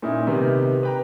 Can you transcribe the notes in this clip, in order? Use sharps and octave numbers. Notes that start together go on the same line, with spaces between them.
A#2 C#4 D#4 E4
C3 D#3 B3
B4 G5 A#5